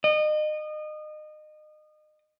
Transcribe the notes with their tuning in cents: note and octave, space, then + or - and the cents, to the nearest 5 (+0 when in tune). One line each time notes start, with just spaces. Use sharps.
D#5 -30